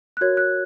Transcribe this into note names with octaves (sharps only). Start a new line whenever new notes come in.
F#6
F#4 A#4 C#5 G#6
F#6